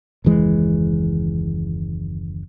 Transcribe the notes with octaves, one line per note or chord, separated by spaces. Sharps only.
F#1 D#2 E3 G#3